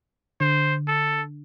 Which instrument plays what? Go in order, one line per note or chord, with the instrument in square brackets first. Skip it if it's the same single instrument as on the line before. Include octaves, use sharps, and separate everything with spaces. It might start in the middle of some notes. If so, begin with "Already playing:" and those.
[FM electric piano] D3 [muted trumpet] C5
[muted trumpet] A4